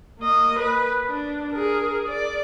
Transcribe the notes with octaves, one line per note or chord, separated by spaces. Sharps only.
A#3 D#5
B4
D4
G#4 A#4
D5